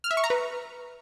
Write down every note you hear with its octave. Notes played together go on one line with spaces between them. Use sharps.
F6
E5
C#6
A#5
B4